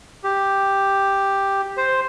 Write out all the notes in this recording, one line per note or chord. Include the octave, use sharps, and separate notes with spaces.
G4
C5